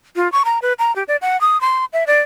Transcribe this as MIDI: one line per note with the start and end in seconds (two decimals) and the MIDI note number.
0.16 0.31 65
0.32 0.43 85
0.45 0.59 82
0.62 0.73 71
0.79 0.94 82
0.96 1.03 67
1.08 1.16 74
1.22 1.39 78
1.41 1.60 87
1.61 1.85 84
1.93 2.04 76
2.07 2.20 74